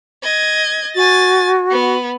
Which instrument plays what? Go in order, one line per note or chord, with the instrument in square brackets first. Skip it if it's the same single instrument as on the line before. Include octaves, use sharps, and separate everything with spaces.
[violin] D#5 G#6
[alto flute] F#4 [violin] G#5 A6
[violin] B3